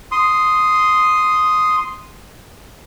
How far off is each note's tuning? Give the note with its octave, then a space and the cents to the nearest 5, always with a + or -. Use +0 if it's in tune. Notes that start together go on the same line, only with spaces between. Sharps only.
C6 -5 D#6 +0